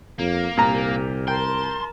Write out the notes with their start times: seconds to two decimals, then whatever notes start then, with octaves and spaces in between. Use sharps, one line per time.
0.19 F2 A#3
0.57 C2 A#2 G4 A#5
1.28 A#4 G5 A5 C6